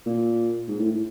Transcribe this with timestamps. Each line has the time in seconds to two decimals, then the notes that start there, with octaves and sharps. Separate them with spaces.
0.06 A#2
0.68 G#2
0.79 A2